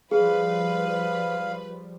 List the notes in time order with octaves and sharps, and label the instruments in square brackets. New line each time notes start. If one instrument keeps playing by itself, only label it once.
[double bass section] F3 G3 [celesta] G#4 [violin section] B4 [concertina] F5